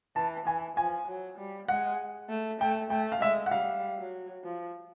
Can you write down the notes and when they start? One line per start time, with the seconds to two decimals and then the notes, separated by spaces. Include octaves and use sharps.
0.16 E3 A5
0.46 E3 G#5
0.77 F3 G#5
1.07 F#3
1.38 G3
1.68 G#3 F#5
2.29 A3
2.60 A3 G5
2.90 A3 G5
3.12 F5
3.21 G#3 E5
3.46 F#5
3.51 G3 F5
3.98 F#3
4.44 F3